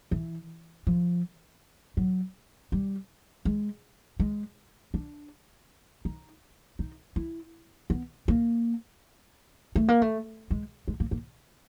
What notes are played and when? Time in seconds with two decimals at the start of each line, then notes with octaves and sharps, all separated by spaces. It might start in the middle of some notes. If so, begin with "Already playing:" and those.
0.11 E3
0.87 F3
1.97 F#3
2.72 G3
3.45 G#3
4.20 G#3
4.94 D4
6.05 D#4
6.79 D#4
7.16 E4
7.90 B3
8.28 A#3
9.76 A3
9.88 A#3
10.02 A3
10.51 G#3
10.88 G#3
11.00 A#3
11.11 A#3